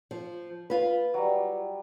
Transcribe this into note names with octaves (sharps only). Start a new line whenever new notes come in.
F3
F4 B4
F#3 G3